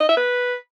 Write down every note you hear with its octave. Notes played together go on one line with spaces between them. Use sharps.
D#5
E5
B4